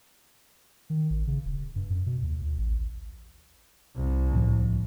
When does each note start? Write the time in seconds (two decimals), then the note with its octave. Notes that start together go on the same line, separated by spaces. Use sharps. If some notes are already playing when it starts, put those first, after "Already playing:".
0.90 D#3
1.10 A1
1.27 C#3
1.45 D#1
1.76 G2
1.90 F#2
2.06 B2
2.23 D#2
2.41 D2
2.58 A1
3.97 C2
4.32 D2 A2 F3